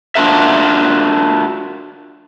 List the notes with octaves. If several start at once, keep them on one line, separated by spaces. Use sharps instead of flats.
D4 F4 F#4 A4 A#4 E5